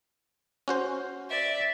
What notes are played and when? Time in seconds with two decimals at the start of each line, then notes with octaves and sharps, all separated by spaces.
0.68 C#4 F#4 C5
1.30 D5 E5